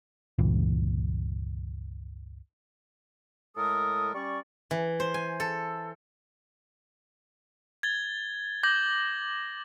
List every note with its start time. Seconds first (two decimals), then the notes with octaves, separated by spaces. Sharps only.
0.38 G1 C#2 A#2 E3
3.56 A2 G#3 A4 A#4 D#6
4.14 G3 C#4 D5 C#6
4.71 E3
5.00 C5
5.14 G#5
5.40 A4
7.83 G#6 A6 G7
8.63 D6 G6 A#6 F#7